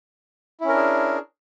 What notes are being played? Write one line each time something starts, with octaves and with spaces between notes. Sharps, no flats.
C#4 D4 E4 G#4 A#4